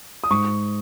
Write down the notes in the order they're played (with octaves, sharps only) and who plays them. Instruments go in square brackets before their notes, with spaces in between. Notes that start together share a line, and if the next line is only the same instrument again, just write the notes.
[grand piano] D#6
G#2 C#6